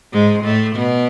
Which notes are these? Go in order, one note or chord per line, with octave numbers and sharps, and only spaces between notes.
G#2 G#3
A2 A3
B2 B3